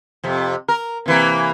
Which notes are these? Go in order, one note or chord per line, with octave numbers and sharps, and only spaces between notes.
F2 C3
A#4
C3 E3 A#3